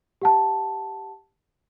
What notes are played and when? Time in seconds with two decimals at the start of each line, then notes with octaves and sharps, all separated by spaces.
0.22 G4 F#5 A5